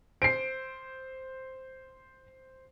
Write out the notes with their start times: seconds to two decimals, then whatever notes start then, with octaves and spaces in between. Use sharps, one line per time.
0.22 C5 C7 D7